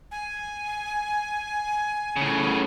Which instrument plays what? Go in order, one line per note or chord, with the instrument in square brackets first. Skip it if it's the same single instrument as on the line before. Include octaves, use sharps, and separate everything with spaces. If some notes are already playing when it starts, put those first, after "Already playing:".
[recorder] G#5
[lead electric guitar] A2 C#3